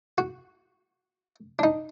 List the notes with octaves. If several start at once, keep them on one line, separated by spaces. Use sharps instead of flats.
F#4
D4 D#4